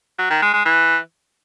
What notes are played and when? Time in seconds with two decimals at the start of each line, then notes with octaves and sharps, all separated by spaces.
0.19 F#3
0.30 D#3
0.42 G#3
0.54 G#3
0.65 E3